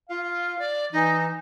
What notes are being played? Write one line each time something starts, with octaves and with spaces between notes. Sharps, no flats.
F4 F5
D5
E3 D#4